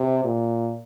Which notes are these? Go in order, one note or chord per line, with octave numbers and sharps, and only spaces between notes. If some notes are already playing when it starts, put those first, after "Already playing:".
Already playing: C3
A#2